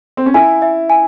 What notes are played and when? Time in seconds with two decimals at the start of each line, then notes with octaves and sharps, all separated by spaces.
0.17 C4
0.26 C#4
0.34 E4 G#5
0.62 E5
0.90 G#5